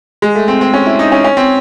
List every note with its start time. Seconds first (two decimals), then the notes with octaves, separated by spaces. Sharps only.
0.22 G#3
0.35 A3
0.48 C4
0.61 C4
0.74 C#4
0.86 E4
0.99 D#4
1.12 C#4
1.24 C#4
1.37 C4